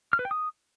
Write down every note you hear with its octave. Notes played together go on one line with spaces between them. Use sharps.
F6
B4
G5
D#6